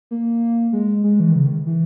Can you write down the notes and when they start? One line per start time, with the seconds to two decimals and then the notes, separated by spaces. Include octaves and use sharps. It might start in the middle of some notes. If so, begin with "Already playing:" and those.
0.11 A#3
0.73 G#3
1.04 G#3
1.20 E3
1.31 D#3
1.36 C#3
1.46 D#3
1.67 E3